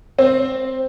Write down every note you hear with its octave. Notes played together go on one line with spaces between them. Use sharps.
C4